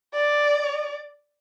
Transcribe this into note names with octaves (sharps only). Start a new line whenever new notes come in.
D5